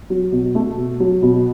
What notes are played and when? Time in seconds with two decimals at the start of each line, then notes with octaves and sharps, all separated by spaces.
0.10 F#3
0.32 B2
0.55 A3
0.77 B2
1.00 F#3
1.22 B2